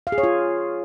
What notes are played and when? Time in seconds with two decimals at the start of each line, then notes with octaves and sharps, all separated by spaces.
0.07 F5
0.12 G#4
0.18 C#5
0.23 F4